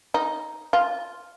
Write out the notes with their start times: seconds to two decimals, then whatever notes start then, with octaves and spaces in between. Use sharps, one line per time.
0.14 D#4
0.73 F4